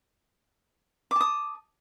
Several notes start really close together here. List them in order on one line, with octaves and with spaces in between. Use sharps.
D6 A5 D#6